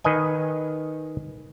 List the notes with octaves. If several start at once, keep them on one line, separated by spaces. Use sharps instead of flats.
D#3 B4 D#5 G#5